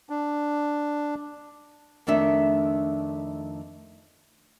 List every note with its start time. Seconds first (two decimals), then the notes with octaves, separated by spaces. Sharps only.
0.10 D4
2.07 F2 D#3 A3 D4 E5